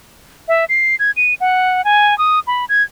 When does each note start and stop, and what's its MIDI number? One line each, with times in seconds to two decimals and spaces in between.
0.48 0.65 76
0.69 0.95 96
0.99 1.11 92
1.16 1.34 99
1.40 1.84 78
1.84 2.17 80
2.18 2.40 87
2.47 2.65 83
2.69 2.83 92